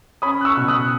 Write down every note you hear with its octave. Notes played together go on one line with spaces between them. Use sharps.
C#4 B5 D#6
F#6
C#6 E6
B2
D#6 F#6